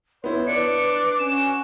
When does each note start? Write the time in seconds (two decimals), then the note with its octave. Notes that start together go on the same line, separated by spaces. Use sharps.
0.24 B3 E4 C5 C#5
0.47 D4 B4 D5 C#7
0.86 D6
1.19 C#4 E7
1.32 F#4